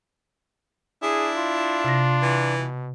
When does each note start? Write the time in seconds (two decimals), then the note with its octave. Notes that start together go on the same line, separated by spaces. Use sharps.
1.03 D4 E4 G#4
1.37 F4
1.84 C3 A#6
2.22 E3
2.59 B2